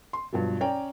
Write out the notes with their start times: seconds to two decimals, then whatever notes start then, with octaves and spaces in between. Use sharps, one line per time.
0.13 C6
0.33 G2 B2 F3 F#3
0.61 C#4 C#5 D5 G5 A#5